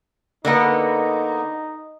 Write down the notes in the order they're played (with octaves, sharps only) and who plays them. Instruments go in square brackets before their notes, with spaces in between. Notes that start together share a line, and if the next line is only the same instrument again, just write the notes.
[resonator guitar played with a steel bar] D3 A#3 B3 [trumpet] D#4